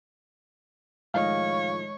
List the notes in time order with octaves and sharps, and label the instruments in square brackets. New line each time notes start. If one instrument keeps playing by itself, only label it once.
[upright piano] A2 D#3 F3 [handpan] G#3 D#5 [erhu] C#5 [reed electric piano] F5